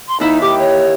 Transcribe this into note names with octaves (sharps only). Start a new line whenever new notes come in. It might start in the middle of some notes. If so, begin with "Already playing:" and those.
C6
D#2 D#4 E4 E5
G4 D6
C#5